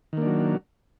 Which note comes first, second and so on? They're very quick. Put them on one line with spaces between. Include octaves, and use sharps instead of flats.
D#3 A#3 D4 F#3